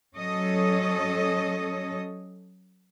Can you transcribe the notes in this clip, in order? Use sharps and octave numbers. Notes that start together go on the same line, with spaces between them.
F#3 C#4 A4 C#5 D#5